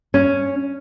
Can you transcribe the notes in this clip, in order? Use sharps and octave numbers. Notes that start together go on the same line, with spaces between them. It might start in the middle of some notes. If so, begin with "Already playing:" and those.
C#4